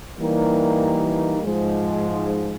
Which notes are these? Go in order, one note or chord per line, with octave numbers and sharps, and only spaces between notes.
E3 G3 A#3 D#4
G#2 F3 G#3